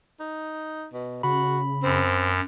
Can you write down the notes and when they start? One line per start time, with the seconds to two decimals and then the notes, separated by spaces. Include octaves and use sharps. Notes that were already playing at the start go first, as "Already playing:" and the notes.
0.20 D#4
0.93 B2
1.23 C#3 F#4 B5
1.83 F#2 C4